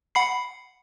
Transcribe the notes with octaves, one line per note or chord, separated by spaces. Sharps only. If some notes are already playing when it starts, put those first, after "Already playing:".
F#5 B5 C7